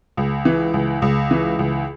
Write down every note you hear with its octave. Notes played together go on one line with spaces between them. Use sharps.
C#2
E3
C#2
C#2
E3
C#2